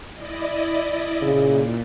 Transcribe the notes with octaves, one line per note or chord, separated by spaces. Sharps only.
E4 D5 D#5
A#2 C#3